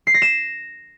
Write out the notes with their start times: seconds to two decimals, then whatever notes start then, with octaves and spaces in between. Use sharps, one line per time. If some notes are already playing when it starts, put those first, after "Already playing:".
0.07 C7
0.14 A#6
0.22 E7